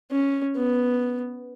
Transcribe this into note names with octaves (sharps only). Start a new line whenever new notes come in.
C#4
B3